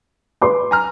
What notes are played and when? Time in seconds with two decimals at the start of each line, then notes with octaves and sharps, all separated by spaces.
0.41 B4 C6 D6
0.71 G#5 A#5 F6